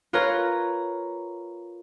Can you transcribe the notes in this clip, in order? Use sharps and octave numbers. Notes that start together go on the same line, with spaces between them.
F4 A#4 B4 C#5 A#5